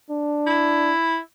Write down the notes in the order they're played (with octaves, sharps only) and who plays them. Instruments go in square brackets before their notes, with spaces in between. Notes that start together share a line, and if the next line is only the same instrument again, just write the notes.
[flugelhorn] D4
[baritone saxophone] E4